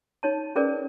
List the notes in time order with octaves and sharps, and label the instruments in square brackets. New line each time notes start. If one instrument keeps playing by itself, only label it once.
[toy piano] D#4 C#5 A5
C#4 G#4 A#4 B4 D5